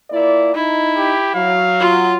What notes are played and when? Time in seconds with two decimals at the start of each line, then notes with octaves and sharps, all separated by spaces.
0.10 A#2 E4 D5
0.55 D#4 E4
0.97 G4
1.35 F#3 F5
1.80 F4